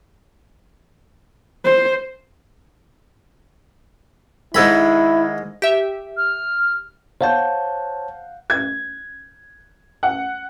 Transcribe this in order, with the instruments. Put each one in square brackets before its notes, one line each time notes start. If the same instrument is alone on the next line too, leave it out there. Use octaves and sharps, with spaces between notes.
[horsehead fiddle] C5
[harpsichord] G#2 A4 B5 [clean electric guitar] D#3 G#3 [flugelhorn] E4
[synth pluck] G4 E5
[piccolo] F6
[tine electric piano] C5 C#5 A5 [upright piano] F5 F#5 G6
[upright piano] G#6
F#5